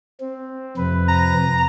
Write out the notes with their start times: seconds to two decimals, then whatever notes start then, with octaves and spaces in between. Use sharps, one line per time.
0.20 C4
0.77 F2 C3 B4
1.09 A#5